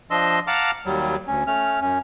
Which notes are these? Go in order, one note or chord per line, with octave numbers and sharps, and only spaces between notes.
F3 D4 D#5 C6 E6
F5 F#5 A5 A#5 D6 F6
D#2 F#3 G3
D2 C#4
A3 C#4 F6
F#2 C#4